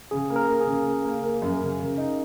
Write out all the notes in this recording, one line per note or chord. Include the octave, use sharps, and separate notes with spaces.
C#3 G#4
A#3
A#4
A#3
G#4
C#3
A#3
A#3
A#3
F#2
C#3
C#3
D#4